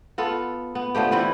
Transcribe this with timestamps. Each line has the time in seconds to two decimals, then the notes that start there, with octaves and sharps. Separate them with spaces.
0.18 B3 F4 A4
0.75 B3
0.95 D3 F3 A3 G4
1.11 E3 C4 E4 B4